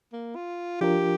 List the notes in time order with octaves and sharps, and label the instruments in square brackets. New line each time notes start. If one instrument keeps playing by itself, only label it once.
[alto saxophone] A#3
F4
[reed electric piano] F3 D4 F4 A#4 [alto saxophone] G4